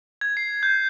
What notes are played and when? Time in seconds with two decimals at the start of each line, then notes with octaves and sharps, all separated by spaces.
0.21 G#6
0.37 C7
0.63 G6